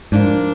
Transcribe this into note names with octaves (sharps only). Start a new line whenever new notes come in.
G#2 F3 A#3 D4